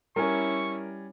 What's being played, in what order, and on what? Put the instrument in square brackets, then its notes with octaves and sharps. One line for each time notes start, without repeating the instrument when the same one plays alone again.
[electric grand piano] G3 G#5 [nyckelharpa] C#4 E4 [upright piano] A#4 [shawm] C#6